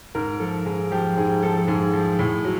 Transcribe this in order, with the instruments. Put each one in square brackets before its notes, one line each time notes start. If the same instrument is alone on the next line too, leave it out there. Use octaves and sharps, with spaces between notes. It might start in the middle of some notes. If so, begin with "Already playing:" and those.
[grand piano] G#2 A#4
F3 A4
G#2 G#4
F3 G4
G#2 G#4
F3 A4
A4
G#2 G#4
F3
A2
F#3